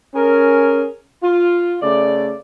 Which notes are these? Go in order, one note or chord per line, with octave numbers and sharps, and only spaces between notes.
C#4 G#4 A#4
F4
C#3 A3 D5